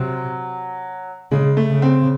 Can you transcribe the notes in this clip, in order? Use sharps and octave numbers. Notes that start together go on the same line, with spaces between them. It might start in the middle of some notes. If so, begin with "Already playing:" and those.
Already playing: C3 F#3
C#3 G#3
A3
C#3
C4